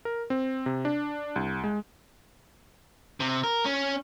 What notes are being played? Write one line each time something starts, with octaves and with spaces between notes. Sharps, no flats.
A#4
C4
C3
D4
C2
G#3
C3
A#4
C#4